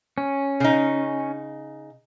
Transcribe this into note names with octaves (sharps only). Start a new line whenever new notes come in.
C#4
C#3 D#4